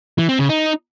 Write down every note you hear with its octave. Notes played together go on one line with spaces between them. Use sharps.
E3
C4
C#3
D#4